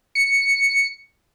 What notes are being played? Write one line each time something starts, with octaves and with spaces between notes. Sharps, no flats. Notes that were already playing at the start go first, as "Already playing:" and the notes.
C#7